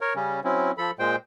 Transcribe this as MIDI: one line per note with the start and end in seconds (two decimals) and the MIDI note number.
0.01 0.14 70
0.01 0.14 73
0.16 0.40 49
0.16 0.40 55
0.16 0.40 61
0.44 0.71 54
0.44 0.71 60
0.44 0.71 61
0.44 0.71 64
0.78 0.91 53
0.78 0.91 69
0.78 0.91 83
0.99 1.16 46
0.99 1.16 56
0.99 1.16 72
0.99 1.16 79